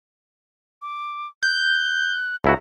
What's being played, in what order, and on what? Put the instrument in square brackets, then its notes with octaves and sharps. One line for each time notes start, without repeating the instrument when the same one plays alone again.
[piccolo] D6
[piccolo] F#6 [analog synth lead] G6
[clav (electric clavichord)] C#2 E4 F#4 [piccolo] A#5